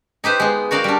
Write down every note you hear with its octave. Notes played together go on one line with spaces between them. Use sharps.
D#4 G4 B4 C5
G#3 B3
F#4 A#4 D5 F5 G5
G3 D4